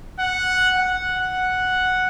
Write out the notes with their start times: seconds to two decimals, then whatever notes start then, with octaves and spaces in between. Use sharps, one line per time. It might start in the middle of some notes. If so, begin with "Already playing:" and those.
0.20 F#5
0.77 F#5